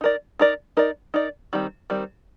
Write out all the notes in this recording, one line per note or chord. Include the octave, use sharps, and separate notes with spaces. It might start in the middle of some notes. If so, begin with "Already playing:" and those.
D#4 A#4 D5
D#4 A#4 D5
D#4 A#4 D5
D#4 A#4 D5
D#3 G3 C4
D#3 G3 C4